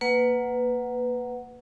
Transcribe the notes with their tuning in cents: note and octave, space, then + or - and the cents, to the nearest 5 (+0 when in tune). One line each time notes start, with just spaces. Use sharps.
A#3 +0 B4 +10 F#5 +0